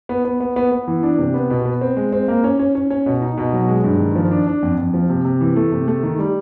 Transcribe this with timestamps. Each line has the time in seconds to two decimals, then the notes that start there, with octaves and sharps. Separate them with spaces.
0.09 B3
0.25 B3
0.40 B3
0.56 B3
0.72 B3
0.88 E3
1.03 D4
1.18 C3
1.34 B3
1.50 B2
1.65 B3
1.81 C4
1.97 G#3
2.13 C4
2.28 A#3
2.44 C#4
2.59 C#4
2.75 C#4
2.90 C#4
3.06 B2
3.22 D#4
3.37 B2
3.53 F#3
3.68 G#3
3.84 G2
4.00 D#3
4.15 F3
4.31 D4
4.47 D4
4.62 F2
4.78 F2
4.94 F3
5.09 C3
5.25 C3
5.41 E3
5.56 A3
5.72 C3
5.88 A3
6.03 D#3
6.19 G3